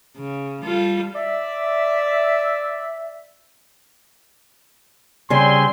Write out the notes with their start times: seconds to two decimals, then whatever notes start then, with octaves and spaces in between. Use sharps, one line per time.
0.17 C#3
0.63 G3 F4 A4
1.15 D5 E5
5.30 C#3 G3 C4 G#5 C6